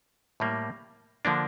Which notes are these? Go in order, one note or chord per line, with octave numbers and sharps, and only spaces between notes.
A2 G3 A#3
D3 F3 A#3 D4